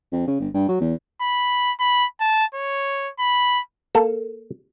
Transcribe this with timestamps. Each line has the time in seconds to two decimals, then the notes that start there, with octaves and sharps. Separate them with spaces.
0.12 F2
0.27 C#3
0.40 G1
0.54 G2
0.69 F#3
0.81 E2
1.21 B5
1.80 B5
2.20 A5
2.54 C#5
3.20 B5
3.95 A#3 A4